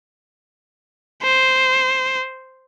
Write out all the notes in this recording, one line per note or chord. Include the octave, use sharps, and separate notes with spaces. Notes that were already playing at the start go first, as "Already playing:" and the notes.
C5